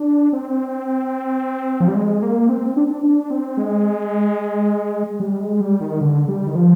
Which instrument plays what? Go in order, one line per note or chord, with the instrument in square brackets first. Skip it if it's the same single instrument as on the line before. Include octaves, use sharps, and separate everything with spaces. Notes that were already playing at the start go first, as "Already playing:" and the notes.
Already playing: [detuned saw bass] D4
C4
F3
G3
G#3
A#3
C4
D4
D4
D4
C4
G#3
G3
G#3
G3
D#3
D3
G3
D#3
F3